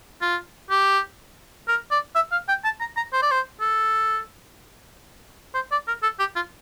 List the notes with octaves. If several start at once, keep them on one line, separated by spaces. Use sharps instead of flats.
F4
G4
A#4
D5
E5
F5
G5
A5
A#5
A#5
C5
D5
C5
A4
C5
D5
A#4
A4
G4
F4